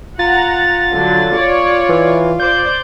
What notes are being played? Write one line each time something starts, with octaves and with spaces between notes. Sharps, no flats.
F4 F#5 A#5 A6
D3 F#3
C#5 D5
E3
C5 D5 G6